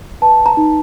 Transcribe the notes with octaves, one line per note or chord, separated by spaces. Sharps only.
B4 A5
A#5
D#4